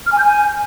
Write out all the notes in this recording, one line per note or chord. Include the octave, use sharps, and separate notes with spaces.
F6
G#5
G6
G#5